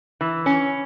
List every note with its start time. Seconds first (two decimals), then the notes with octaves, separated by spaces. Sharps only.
0.21 E3
0.46 C#4